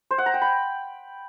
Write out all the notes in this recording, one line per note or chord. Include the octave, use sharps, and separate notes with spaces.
C5
F#5
A#5
G5
B5